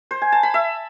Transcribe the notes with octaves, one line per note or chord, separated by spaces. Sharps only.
C5
G#5
A5
B5
E5